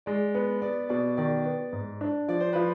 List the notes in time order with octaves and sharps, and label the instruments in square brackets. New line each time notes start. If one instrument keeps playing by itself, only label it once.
[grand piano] G#3 [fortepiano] D5
[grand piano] B3 [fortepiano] B4
[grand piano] B3 [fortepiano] D5
[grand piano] B2 [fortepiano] D5
[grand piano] D#3 [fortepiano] D5
[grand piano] B3
G#2
D4
[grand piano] F3 [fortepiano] D5
[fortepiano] C5
[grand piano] F3 [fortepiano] B4